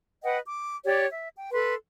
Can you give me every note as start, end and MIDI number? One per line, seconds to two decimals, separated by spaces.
0.23 0.37 71
0.23 0.37 75
0.23 0.37 78
0.23 0.37 79
0.46 0.76 86
0.84 1.05 67
0.84 1.05 73
0.84 1.05 74
1.09 1.28 76
1.35 1.49 79
1.52 1.75 69
1.52 1.75 71
1.52 1.75 84